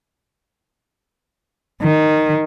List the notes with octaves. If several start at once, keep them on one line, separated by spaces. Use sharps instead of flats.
D#3